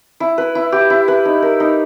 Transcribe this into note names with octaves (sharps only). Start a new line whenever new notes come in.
E4
B4
E4
G4
E4
B4
D#4
A#4
D#4